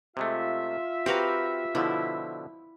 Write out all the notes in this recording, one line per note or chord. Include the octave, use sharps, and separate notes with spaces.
C3 G#3 A3 F4 E5
C4 F#4 G4 B4 F5 A#5
B2 D3 F3 E4